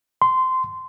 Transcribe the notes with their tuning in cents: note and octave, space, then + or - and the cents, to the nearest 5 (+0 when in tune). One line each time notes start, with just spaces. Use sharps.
C6 -15